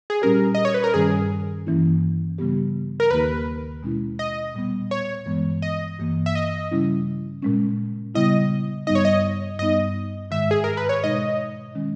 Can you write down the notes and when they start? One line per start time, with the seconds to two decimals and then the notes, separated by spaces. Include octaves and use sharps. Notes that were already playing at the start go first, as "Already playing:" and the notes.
0.10 G#4
0.22 A#2 G3 C#4 G4 A#4
0.55 D#5
0.65 C#5
0.74 B4
0.84 A#4
0.94 G2 D#3 G3 C#4 G#4
1.66 G2 E3 A#3 C#4 E4
2.38 C#3 G3 B3 G4
3.00 A#4
3.11 D#2 D#3 A#3 D#4 G4 B4
3.83 B2 G#3 C#4 E4
4.19 D#5
4.55 A#2 G3 B3
4.91 C#5
5.26 G2 E3 G#3 B3
5.62 D#5
5.99 G2 E3 A#3
6.26 E5
6.35 D#5
6.71 C#3 G3 C#4 E4
7.42 A#2 G#3 C#4
8.15 C#3 G3 B3 E4 D#5
8.87 G2 G3 B3 D#4 D#5
8.95 C#5
9.05 D#5
9.58 G2 G3 B3 D#4 D#5
10.31 G#2 D#3 G#3 E5
10.51 G#4
10.64 A#4
10.77 B4
10.89 C#5
11.04 B2 G#3 D#4 D#5
11.75 D#3 G#3 C#4